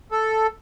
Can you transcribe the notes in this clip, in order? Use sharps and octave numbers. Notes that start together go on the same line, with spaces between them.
A4